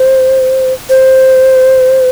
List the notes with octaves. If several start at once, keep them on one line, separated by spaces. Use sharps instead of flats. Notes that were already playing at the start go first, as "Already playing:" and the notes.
Already playing: C5
C5